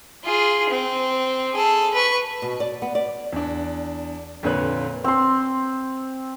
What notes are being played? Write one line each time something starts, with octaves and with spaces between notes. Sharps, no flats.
F4 G#4
C4
G#4 A4
B4 C#6
B2
D5
B3
D5
E2 D4
F2 A#2 D3 B4 C#5 F#6
C4 C6